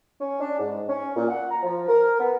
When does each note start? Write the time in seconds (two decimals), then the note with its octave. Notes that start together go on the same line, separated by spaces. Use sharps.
0.21 C#4
0.41 D4
0.59 G#2
0.88 C#4
1.16 A#2
1.29 F#5
1.51 A#5
1.63 F3
1.88 A#4
2.19 B3